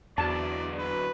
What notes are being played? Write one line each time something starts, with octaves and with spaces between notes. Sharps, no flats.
E2 D3 F#3 D5 A5
B4